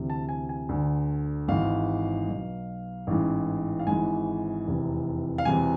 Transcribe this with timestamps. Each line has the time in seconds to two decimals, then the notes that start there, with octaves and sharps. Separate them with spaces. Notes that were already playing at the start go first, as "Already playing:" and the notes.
Already playing: D2 C3 E3
0.10 A5
0.29 G#5
0.49 G#5
0.69 D2 D3
1.48 G#1 G#2 E3 F5
2.28 B1 B2
3.07 A1 G#2 E3
3.79 F5
3.87 G#1 G#2 E3 G#5
4.67 F1 E2 C3 E3
5.38 F5
5.45 E1 E2 C3 E3 G#5